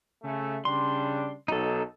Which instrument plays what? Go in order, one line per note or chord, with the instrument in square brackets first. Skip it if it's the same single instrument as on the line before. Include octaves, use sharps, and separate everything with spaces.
[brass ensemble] C#3 A3
[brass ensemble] C#3 G3 D4 [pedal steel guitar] C6
[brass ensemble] B1 F#3 [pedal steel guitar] D#4 A4